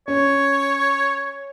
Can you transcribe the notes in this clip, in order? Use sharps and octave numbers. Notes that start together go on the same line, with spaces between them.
C#4 C#5